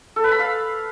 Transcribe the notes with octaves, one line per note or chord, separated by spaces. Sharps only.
A4
B4
B5
F5